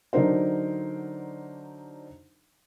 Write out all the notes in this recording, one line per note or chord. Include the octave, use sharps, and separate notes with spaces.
D3 F#3 D4 D#4 A#4 C5